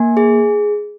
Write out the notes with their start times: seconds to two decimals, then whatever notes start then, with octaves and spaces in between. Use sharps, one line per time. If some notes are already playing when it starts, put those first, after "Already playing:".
Already playing: A#3 G#5
0.17 G#4